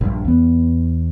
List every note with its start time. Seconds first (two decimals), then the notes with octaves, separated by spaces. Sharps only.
0.01 A#1 G2
0.25 E2 B3